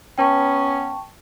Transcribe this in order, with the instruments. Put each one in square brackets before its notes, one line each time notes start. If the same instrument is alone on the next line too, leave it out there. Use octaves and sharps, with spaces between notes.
[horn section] B3 C#4 [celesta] G5 A5 C#6